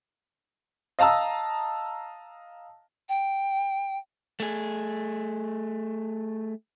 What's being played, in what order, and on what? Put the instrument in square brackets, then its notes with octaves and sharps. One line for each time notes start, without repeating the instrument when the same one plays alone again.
[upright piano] D#5 F5 A5 A#5 D#6 E6
[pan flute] G5
[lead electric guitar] A3 G#4